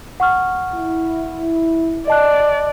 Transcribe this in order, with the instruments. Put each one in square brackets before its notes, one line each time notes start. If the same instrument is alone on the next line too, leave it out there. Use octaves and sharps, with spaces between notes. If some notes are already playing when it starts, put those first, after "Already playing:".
[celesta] F#5 C#6 F6
[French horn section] E4
[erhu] D5 [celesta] D#5 A5 F#6